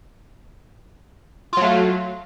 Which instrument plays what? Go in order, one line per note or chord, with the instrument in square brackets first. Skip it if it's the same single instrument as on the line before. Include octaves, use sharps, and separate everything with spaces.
[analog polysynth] F4
F#3
A3